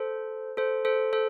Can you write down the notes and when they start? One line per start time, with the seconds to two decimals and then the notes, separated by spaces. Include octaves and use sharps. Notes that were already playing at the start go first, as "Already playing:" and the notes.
Already playing: A4 C5
0.57 A4 C5
0.85 A4 C5
1.13 A4 C5